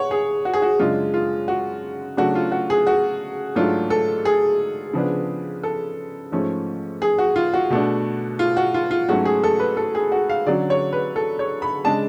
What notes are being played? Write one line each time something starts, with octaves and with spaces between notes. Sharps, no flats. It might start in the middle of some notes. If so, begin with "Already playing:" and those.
Already playing: C#5 F#5
G#4
F#4
G#4
F#4
F#2 C#3 G#3 D4 F4
F4
F#4
C#3 F#3 A3 D4 F#4
F4
F#4
G#4
F#4
G#2 F#3 A3 D4 F4
A4
G#4
C#3 F3 B3 D4
A4
G#2 F3 A3 C#4
G#4
F#4
F4
F#4
B2 A3 D4
F4
F#4
F4
F4
G#2 F#3 A3 C#4 F#4
G#4
A4
B4
A4
G#4
F#4
F5
D3 F#3 C#4 D5
C#5
B4
A4
C#5
B5
C#3 G#3 D4 A5